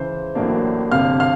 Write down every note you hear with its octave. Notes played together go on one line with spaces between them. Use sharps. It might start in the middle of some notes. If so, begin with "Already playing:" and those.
Already playing: C#2 C#3 E3 C5 C6
A1 A2 F#3 A#3 D4
G1 F2 C3 F5 F6
F5 F6